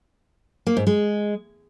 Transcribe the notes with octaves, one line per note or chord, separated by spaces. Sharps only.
A#3
G#2
G#3